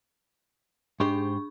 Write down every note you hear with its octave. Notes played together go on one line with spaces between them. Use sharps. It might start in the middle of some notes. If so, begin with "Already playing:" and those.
G#2 D4 G4 C5 C#6